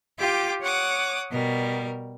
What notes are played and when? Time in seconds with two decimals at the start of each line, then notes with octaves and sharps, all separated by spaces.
0.19 F4 G4 G5 D6
0.63 C#5 F#5 D6 D#6
1.32 B2 G3 A#4